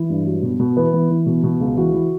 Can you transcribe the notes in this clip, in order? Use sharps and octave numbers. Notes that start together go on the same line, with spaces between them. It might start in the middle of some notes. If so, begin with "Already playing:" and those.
Already playing: E3
G2
F#3
B2
B2
E3 B3 B4
E3
E3
B2
B2
C#2
E3 F#4
E3